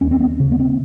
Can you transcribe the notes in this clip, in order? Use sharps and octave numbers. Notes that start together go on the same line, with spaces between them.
D#2 C#4
C4
B3
C#3
B3
C4